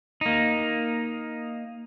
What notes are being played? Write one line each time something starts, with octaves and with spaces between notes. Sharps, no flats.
A#3 D#4